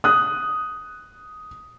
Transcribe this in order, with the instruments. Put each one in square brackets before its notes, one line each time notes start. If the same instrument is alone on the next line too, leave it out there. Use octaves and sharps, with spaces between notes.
[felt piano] D#6 F#6